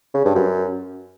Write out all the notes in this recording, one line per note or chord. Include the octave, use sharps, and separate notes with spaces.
C#3
G2
F#2